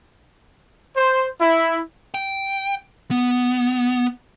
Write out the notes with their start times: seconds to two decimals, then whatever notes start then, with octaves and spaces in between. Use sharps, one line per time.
0.96 C5
1.41 E4
2.14 G5
3.11 B3